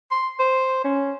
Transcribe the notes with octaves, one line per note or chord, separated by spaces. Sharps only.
C6
C5
C#4